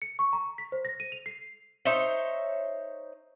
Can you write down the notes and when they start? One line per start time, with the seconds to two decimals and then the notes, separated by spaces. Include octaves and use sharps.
0.02 C#7
0.19 C#6
0.33 A#5
0.58 B6
0.72 C5
0.85 A#6
1.00 D#7
1.12 F7
1.26 C7
1.85 D#4 C5 C#5 E5